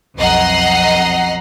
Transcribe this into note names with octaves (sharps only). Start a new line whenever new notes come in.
B1 F2 D#5 F#5 A#5 C7